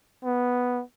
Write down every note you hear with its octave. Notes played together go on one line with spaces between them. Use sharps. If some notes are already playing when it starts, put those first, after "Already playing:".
B3